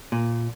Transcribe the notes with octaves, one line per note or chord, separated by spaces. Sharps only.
A#2